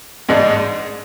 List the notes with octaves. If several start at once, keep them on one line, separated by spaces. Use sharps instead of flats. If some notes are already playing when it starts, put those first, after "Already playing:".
A1 G#2 G#3 D4